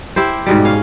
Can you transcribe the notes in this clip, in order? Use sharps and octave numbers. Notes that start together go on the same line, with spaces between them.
E4 G4 C5
G#2 B2 G3
C#4 F5